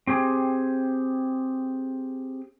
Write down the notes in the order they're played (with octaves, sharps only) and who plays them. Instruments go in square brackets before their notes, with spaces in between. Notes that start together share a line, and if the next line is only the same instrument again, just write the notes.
[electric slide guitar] C4 G4 G#4